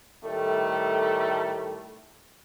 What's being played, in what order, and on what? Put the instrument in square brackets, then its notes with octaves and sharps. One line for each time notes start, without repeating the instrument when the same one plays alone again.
[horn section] A2 D#3 G3 A3